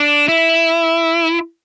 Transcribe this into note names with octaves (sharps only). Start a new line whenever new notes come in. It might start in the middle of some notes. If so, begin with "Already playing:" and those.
Already playing: D4
E4